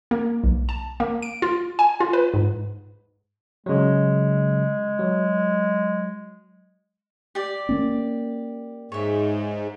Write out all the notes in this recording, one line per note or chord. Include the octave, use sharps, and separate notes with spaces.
A#3
B1
A5
A#3
D7
F4
G#5
F4
B4
G#2
C#3 F#3 G#3
F#3
G4 D5
A#3 C#4
G#2 C#5 E5